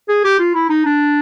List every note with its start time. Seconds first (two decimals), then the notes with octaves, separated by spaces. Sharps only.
0.09 G#4
0.25 G4
0.39 F4
0.55 E4
0.70 D#4
0.86 D4